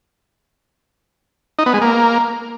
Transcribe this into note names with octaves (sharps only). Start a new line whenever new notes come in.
D#4
B3
G#3
A#3